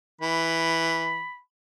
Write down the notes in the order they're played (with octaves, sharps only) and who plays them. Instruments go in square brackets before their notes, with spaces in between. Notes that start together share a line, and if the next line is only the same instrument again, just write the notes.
[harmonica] E3 [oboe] B5